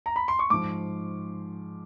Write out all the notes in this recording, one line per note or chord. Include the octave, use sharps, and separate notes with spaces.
A#5
B5
C6
C#6
G#2 F3 D6